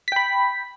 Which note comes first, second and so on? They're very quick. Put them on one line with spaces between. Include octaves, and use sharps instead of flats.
B6 G5 B5